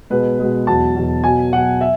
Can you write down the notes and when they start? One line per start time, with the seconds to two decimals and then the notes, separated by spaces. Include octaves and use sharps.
0.10 B2 G#3 B4
0.40 B2 G#3
0.67 E2 B2 F#3 A5
0.96 E2 B2 F#3
1.24 B2 F#3 G#5
1.52 B2 F#3 F#5
1.81 E5